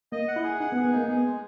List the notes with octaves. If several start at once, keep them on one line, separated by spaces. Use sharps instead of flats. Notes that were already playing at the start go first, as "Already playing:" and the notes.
A#3 D#5
F#5
E4
G#4
D#4 F#5
B3
G#4
B3
A#3 D#4
B3 G#4
G#3